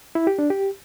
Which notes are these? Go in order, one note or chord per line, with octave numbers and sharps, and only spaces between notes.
E4
G4
D4
G4